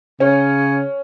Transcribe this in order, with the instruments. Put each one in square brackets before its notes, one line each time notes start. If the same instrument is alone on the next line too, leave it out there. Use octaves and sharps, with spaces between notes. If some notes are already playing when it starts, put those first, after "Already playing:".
[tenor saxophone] C#3 [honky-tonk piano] C#4